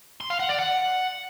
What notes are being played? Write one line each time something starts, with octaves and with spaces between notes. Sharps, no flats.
C6
F5
F#5
D5
F#5